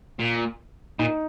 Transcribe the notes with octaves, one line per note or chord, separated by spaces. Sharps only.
A#2
A#2 D#4